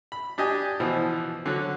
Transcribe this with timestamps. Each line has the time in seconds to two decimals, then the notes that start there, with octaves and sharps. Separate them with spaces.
0.12 B5
0.38 D4 G4 D#5 G#5
0.80 B2 E3 F3
1.46 D3 F#3